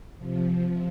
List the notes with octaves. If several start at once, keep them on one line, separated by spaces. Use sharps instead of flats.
C3 F3